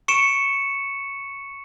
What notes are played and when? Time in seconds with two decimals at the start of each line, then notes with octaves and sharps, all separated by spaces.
0.08 C#6 C#7 D7 E7